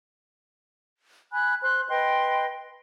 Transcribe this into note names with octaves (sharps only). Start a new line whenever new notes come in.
G#5 B5 F#6
C5 C6 F#6
B4 D#5 G5 C6